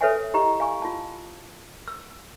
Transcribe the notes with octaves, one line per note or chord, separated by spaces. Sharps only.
A4 B4 C#5 E5 F#5 G#5
E4 G4 D#5 A#5
F5 G#5 C#6
F4 A5
E6